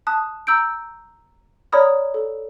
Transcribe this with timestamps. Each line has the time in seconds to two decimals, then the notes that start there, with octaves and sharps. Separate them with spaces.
0.07 A5 D#6 F#6
0.47 A#5 E6 G6 D7
1.72 C#5 D5 A#5 B5 D#6 F6
2.14 A4